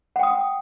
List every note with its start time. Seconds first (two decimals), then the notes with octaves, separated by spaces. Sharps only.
0.16 F#5
0.19 G5
0.23 D#6